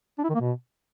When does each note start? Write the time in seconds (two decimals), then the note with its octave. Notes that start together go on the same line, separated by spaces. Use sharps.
0.18 D4
0.24 E4
0.29 D#3
0.35 A#3
0.41 B2